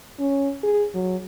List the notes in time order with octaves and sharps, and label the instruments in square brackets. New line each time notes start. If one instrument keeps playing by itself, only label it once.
[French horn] C#4
G#4
F#3